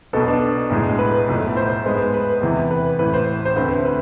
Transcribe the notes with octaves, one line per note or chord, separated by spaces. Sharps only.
B1 B2 B3 A4
D4
B1 A2 G#3
B4
B1 A2 F3 A3
C5
G#2 G#3 B3
B4
E2 C3 E3
B4
A1 A2 E3 B4
C5
C5
D2 D3 A3 C4 B4
B4